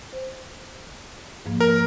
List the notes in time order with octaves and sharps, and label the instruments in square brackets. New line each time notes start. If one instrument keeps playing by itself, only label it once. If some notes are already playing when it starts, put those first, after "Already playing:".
[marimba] C5
G#2 F3 A#3
[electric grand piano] A#4